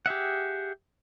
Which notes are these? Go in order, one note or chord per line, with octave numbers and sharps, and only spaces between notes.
G4 G#4 E5 F#5